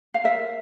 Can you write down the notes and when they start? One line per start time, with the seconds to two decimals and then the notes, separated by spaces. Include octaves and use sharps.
0.14 F5
0.24 A#4 E5